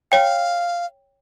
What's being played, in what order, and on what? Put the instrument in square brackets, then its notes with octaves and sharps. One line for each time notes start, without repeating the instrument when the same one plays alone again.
[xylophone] C#5 G5 [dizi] F5